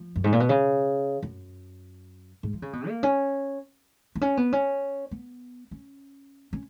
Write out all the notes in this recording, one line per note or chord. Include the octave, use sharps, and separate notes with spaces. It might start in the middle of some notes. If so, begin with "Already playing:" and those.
Already playing: F3
F#2
G#2
A#2
B2
C#3
F#2
G#2
F3
C#3
B2
A#3
C#4
B3
C#4
B3
C#4
B3
C#4
C#4